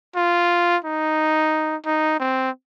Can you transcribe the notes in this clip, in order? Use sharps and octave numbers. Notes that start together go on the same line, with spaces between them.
F4
D#4
D#4
C4